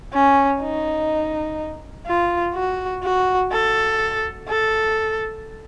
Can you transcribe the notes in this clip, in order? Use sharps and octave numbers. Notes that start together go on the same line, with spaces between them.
C#4
D#4
F4
F#4
F#4
A4
A4